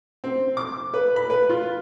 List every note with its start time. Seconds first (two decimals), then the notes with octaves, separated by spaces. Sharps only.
0.24 C4
0.57 D6
0.94 B4
1.16 B5
1.30 B4
1.49 F4